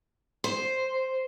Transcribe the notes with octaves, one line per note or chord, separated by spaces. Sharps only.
C5